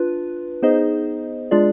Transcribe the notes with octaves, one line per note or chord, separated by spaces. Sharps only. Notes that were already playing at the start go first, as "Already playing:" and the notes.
Already playing: D4 F4 B4
B3 D#4 G#4 C5 D#5
G#3 D4 F4 G#4 D5